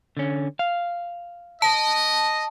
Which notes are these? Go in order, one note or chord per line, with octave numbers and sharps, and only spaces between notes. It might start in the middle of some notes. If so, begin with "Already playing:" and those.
D3 C#4
F5
D#5 A5